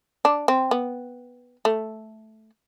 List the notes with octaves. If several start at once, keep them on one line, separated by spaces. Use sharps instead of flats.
D4
C4
B3
A3